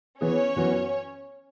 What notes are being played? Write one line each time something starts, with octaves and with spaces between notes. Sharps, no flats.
E3 B3 C#4 G#4 C#5
F#2 E3 B3 F#4